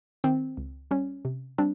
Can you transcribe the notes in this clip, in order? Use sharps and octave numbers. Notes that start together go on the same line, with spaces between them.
D#3 C4
C#2
G3 C#4
C3
G3 C4 D4